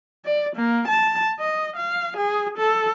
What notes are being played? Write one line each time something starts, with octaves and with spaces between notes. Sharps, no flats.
D5
A#3
A5
D#5
F5
G#4
A4